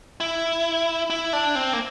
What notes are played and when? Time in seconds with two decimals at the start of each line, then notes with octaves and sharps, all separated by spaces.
0.20 E4
1.10 E4
1.33 D4
1.55 C4
1.73 A#3